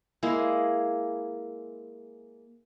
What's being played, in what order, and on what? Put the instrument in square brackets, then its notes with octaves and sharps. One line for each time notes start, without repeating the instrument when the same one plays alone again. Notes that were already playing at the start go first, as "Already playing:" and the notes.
[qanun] G#3 A#3 E4 G#4